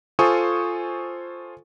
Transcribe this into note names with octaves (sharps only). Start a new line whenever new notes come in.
F4 A4 C5 G#5 C#6 D#6